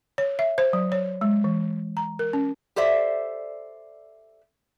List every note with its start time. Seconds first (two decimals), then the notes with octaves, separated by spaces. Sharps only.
0.18 C#5
0.39 E5
0.58 C5
0.73 F#3
0.92 C#5
1.21 G#3
1.44 E3
1.97 A#5
2.19 A#4
2.33 C#4
2.76 G4 A4 C5 D5 E5